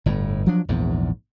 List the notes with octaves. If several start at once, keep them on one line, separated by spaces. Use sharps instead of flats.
G1 A2
F3 F#3 D4
A#1 E2 G#2